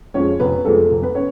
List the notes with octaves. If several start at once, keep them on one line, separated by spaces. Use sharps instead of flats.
F2 F3 G#3 C#4 C#5
F1 B3 B4
F2 F3 G#3 A3 A4
F1
B3 B4
C#4 C#5